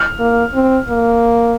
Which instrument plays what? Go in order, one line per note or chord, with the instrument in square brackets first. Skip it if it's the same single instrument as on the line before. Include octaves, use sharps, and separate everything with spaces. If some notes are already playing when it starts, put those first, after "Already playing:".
Already playing: [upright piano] F6
[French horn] A#3
C4
A#3